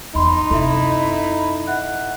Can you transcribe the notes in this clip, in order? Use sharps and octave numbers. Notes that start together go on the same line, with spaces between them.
E2 G2 D#4 B5 C6
F#2 C3 E4 A4 E5
E5 F#5 F#6